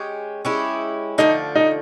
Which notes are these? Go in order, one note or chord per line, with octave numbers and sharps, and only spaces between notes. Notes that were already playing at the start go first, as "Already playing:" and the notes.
Already playing: G#3 C#4 G4
G#3 C#4 E4 G4
D3 F3 A3 D#4
D#4